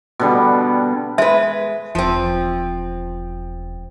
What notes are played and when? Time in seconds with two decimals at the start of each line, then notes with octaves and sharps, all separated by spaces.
0.19 B2 D3 G3
1.18 G#3 B4 E5
1.95 E1 F3 C4